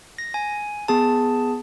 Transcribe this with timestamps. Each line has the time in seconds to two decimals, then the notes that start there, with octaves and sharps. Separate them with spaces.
0.18 A#6
0.34 G#5
0.88 B3 G#4 A5